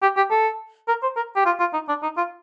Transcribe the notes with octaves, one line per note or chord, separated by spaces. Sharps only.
G4
G4
A4
A#4
C5
A#4
G4
F4
F4
D#4
D4
D#4
F4